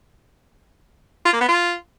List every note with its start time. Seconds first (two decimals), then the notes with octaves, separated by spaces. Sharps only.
1.25 F4
1.33 A#3
1.41 B3
1.48 F4